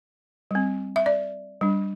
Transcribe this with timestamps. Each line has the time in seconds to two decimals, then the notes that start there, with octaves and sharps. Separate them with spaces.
0.51 G3 C4
0.96 E5
1.06 D5
1.61 G3 D4